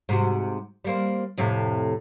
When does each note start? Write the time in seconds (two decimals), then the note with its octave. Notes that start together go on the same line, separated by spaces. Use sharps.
0.09 G#2 C3 F#4
0.85 G3 A#3 C4
1.38 F2 A2 C3